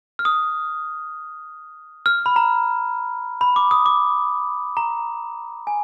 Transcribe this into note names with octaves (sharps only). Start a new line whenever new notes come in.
F6
D#6
F6
B5
A#5
B5
D6
D#6
D6
A#5
G#5